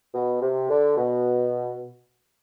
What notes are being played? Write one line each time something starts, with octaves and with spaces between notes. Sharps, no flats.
B2
C3
D3
B2